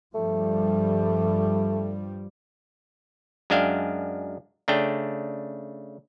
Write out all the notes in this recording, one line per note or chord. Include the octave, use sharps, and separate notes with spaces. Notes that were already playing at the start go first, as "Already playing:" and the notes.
G2 F3 G3 A3
F#2 G#3 D4 E5 F5 G5
C#3 A3 D4 G5